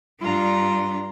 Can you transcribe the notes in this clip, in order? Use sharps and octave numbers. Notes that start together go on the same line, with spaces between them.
G2 D4 F4 A#5